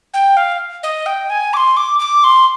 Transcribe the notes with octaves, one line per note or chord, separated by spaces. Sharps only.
G5
F5
D#5
G5
G#5
D6
C6
D6
D6
C6